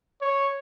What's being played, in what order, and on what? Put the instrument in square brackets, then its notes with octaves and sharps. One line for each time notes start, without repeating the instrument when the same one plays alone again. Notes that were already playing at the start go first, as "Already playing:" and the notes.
[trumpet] C#5